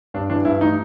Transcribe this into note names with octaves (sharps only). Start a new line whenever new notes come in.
G2 D4
E3 D4
G2 E4
A3 D#4